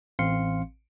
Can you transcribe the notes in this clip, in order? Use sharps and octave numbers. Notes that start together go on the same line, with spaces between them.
A1 C4 F5 C6 C#7